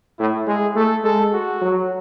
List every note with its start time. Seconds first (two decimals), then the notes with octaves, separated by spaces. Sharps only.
0.19 A2 E4
0.47 G#3 G#4
0.76 A3 A4
1.04 G#3 A4
1.33 F#4
1.62 F#3